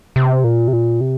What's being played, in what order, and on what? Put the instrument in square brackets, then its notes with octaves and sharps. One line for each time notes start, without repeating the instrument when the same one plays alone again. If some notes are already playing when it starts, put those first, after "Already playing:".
[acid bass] C3
A#2
C3
A#2
C3